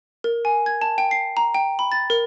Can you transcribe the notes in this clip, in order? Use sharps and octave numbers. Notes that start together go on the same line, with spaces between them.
A#4
G#5
G#6
A5
G5
C7
A#5
G5
B5
A6
A#4